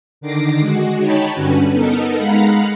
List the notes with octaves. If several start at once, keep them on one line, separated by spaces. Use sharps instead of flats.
D3 D#3 D6 A#6 C7
G#3 F#4
D#4 C#5 G5 A5 B5
G2 D3 C#4 F#4 B4
B3 D#4 A4 A#4
G#3 F5 F#5 A#5 B5